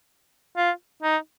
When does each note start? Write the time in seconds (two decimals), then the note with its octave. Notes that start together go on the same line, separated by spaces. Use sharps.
0.57 F4
1.03 D#4